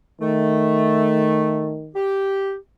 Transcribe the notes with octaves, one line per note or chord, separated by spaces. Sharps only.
D#3 A3
G4